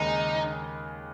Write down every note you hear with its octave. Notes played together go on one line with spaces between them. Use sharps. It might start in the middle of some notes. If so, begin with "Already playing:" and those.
Already playing: D#2 C#3 G#3 D#4